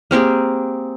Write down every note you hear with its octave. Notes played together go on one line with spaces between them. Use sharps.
A#3 C4 G4 G#4